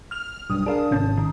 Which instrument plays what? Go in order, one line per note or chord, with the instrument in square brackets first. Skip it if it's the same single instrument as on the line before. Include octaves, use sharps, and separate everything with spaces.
[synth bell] F6 F7
[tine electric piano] B1 G2 [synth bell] D#6
[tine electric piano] D4 F5 [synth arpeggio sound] G#4 A#4
[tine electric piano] G#1 A5 [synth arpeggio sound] C3 C#4
[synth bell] D#3